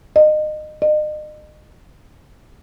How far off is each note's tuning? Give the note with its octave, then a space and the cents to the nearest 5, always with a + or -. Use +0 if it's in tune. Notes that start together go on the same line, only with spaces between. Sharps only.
D#5 -25
D#5 -40